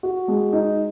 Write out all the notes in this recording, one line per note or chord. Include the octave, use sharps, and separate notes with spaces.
F#4
G#3
D#4